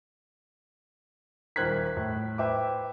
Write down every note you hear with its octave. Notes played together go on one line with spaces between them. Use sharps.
D#1 A#4 C5 F#6 G#6 B6
A2
B4 C5 E5 G5 D6